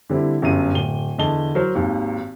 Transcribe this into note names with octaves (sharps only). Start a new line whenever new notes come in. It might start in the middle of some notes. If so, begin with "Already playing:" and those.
D3 G3 C4 E4
G1 F#2 D#7
D1 G7
E2 D3 D#5 A5 G7
F#3 A#4 C5
G#1 D#2